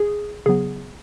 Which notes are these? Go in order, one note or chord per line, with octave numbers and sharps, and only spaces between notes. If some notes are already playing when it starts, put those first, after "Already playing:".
Already playing: G#4
C#3 F#3 B3 G#4